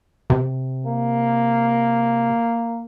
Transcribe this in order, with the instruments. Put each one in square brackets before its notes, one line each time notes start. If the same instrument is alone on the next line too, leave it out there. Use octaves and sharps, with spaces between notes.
[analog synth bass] C3
[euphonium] A#3